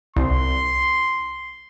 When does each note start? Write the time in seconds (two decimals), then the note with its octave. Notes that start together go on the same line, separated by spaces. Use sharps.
0.16 C2 C6